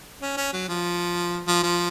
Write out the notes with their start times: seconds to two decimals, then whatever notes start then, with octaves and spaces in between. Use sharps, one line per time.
0.21 C#4
0.37 C#4
0.53 F#3
0.69 F3
1.47 F3
1.63 F3